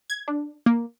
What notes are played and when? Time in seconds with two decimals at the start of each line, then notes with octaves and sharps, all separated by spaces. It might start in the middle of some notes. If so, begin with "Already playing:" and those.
0.10 G#6
0.28 D4
0.66 A#3